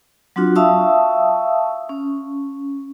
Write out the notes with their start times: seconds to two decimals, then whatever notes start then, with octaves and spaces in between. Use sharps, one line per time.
0.36 F#3 C4 D4 F4 F#4
0.56 E5 F5 A5 C#6 D#6 E6
1.89 C#4